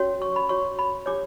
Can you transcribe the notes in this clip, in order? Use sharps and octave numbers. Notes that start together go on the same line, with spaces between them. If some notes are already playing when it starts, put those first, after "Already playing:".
Already playing: C#4 F#4 C#5
C#6
B5
F#4 C#5 C#6
B5
D4 G4 C#5 D6